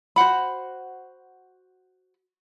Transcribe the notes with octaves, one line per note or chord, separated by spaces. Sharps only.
F#4 C5 F#5 B5